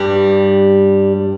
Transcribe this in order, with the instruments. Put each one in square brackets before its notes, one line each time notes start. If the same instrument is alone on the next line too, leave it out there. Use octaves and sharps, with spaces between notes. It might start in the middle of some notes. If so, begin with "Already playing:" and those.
Already playing: [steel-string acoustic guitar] G2 G3